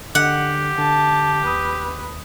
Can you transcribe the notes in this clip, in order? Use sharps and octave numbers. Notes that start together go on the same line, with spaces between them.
D3 G4 F#5
D3 A5
D#2 B4 D#6